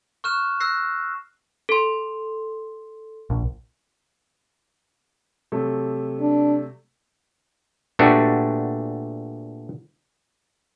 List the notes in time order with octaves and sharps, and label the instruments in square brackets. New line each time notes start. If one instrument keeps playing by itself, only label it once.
[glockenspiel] C#6 F6 F#6 E7
E6 F#6 A#6 C7
[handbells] A4 C6
[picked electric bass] A#1
[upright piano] C3 F#3 A3
[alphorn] D4
[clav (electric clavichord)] A#2 A3 B3 D4 F#4 G4